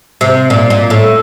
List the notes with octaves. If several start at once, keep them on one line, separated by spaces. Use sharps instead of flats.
C3
A#2
A#2
A2